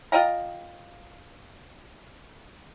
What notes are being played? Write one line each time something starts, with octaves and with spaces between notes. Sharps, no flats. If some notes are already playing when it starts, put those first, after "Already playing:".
F4 D#5 G5 A#5